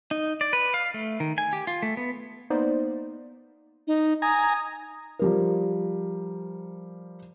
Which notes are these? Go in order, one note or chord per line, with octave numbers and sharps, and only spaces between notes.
D#4
D5
B4
F5
A3
D#3
G#5
G4
F4
A3
B3
A#3 B3 D#4 C5 D5
D#4
G#5 A#5 D#6
F3 G3 A#4